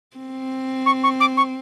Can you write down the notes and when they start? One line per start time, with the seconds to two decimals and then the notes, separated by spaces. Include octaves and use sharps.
0.17 C4
0.86 C#6
1.04 C#6
1.20 D6
1.37 C#6